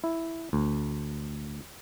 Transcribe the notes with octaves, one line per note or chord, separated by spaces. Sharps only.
E4
D2